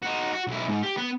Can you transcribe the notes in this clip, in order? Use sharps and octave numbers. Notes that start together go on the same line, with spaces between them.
D#4 F#4
F#4
B1 E4
G#2
G4
B3